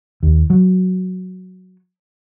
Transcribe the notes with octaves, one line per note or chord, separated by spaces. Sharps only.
D#2
F#3